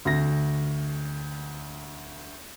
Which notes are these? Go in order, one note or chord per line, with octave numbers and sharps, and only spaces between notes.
D2 A#6